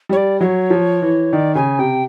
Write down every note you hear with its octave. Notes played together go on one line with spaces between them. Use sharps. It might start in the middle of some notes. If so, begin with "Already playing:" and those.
G3 C#5
D5
F#3 C#5
F3
E3
D#3 D5
C#3 G#5
C3 G5